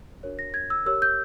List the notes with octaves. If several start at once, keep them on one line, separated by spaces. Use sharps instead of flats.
D4 F#4 A#4 C#5
A#6
G#6
E6
G4 A#4 C#5 E6
G6